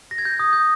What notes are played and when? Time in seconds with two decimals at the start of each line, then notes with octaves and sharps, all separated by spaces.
0.11 A#6
0.18 G#6
0.25 G6
0.39 D#6
0.53 G6